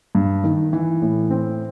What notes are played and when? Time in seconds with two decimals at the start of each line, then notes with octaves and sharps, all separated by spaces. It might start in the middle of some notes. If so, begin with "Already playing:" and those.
0.15 G2
0.44 D#3
0.73 E3
1.02 A2
1.30 C4